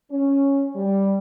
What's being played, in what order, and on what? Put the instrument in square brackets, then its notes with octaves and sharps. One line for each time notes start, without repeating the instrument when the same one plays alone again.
[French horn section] C#4
G3